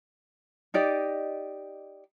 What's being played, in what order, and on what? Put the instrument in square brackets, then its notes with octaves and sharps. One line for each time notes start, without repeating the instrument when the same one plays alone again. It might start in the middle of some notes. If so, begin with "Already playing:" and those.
[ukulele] D#4 G4 D5 D#5